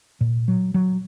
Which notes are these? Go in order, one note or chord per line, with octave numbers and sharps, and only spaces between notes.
A#2
F#3
F#3